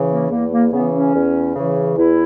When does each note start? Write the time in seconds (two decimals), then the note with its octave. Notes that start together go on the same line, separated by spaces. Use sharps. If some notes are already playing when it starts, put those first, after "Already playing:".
Already playing: C#3 E3
0.10 A#3
0.30 E2 A#3
0.51 A#3
0.72 C#3 E3 B3
0.93 C#4
1.13 E2
1.55 C#3 E3
1.96 E2 E4